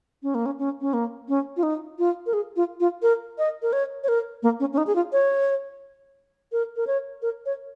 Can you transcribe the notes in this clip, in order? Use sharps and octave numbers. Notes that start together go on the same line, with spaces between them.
C#4
A#3
C#4
C#4
C#4
A#3
C#4
F4
D#4
F4
A#4
G#4
F4
F4
A#4
D#5
A#4
C#5
C#5
A#4
A#3
C#4
C#4
D#4
G#4
F4
C#5
A#4
A#4
C#5
A#4
C#5